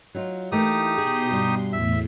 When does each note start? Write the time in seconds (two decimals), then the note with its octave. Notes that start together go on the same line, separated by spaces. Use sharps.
0.15 F#3 D#4 F4
0.52 E3 A3 A#3 D#4 G4 D#6
0.98 B2 G#4 C6
1.31 G2 G3
1.73 E2 A2 E5